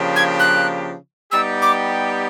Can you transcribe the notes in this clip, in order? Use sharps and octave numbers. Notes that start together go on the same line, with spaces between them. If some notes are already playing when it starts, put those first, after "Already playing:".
Already playing: C#3 F3 A#3 D4 G4
G#6
F#6
G3 B3 D#4 G4 E6
D6